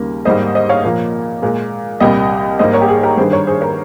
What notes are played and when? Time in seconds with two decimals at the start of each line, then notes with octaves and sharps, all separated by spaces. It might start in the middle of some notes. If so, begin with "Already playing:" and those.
Already playing: D#2 C#3 G3 A#3
0.25 G#2 G3 A#3 C5 D#5
0.55 C5 D#5
0.69 C#5 F5
0.84 A#2 F3 A#3
1.42 A#2 G#3
2.00 C2 A#2 G3 D#5 G5
2.59 G#2 G3 A#3 C5 D#5
2.73 A#4 C#5
2.81 G4
2.88 G#4
3.03 G4 A#4
3.17 G2 D#3 G3 G#4 C5
3.32 A#4 C#5
3.47 G#4 C5
3.61 A#4 C#5